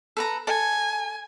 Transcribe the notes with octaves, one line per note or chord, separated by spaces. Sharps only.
A4 B4 A#5
A4 G#5